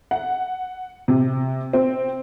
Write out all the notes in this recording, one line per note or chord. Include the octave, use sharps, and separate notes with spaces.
F#5
C3
C4